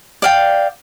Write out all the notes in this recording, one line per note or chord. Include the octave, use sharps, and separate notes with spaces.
D5 F5 G5